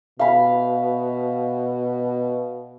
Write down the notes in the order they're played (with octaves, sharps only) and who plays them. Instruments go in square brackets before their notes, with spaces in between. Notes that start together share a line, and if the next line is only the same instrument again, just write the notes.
[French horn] B2 [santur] F5 B5